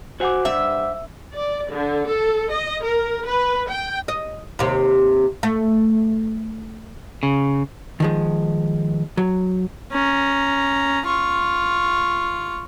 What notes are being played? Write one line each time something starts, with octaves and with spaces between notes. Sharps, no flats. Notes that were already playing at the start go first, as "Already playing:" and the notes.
F#4 C5 F#5 G#5 D6
G2 E5
D5
D3
A4
D#5
A#4
B4
G5
D#5
D#2 C3
A3
C#3
D#3 F3 G#3
F#3
C#4 A#5
F4 C#6